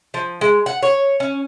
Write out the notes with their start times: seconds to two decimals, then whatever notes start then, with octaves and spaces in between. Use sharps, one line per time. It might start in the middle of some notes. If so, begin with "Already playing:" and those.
0.14 F3
0.41 G#3
0.66 F#5
0.82 C#5
1.20 C#4